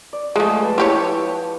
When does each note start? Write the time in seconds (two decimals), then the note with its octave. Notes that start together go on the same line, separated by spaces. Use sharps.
0.13 D5
0.36 F3 G#3 A3 G#4
0.62 B4 A5
0.78 E4 G4 C#5